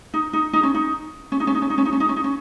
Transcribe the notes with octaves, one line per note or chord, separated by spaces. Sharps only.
D#4
D#4
D#4
C#4
D#4
C#4
D#4
C#4
D#4
C#4
D#4
C#4
D#4
C#4
D#4
C#4
D#4
C#4